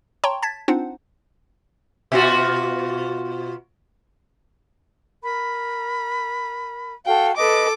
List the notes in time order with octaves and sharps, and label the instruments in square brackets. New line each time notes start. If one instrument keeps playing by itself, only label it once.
[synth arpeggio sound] C#5 G5 A5 A#5 C6 C#6
A5 G#6 A6 B6
C4 D4 D#4 F4 C5 F#5
[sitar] B2 F4 F#4
[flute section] A#4 B5
[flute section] F#4 A4 F5 [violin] G5
[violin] A4 D6 [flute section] B4 D#5